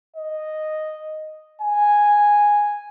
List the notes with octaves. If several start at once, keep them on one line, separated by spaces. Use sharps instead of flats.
D#5
G#5